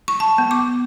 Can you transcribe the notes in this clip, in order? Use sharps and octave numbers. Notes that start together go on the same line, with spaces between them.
C#6
A5
B3
D6